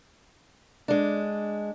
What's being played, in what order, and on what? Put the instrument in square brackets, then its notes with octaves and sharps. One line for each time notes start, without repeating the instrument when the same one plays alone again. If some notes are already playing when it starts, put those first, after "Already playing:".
[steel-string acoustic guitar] G#3 D4